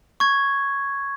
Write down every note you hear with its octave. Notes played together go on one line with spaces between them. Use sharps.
C#6 G#6